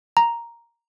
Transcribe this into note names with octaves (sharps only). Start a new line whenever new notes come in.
A#5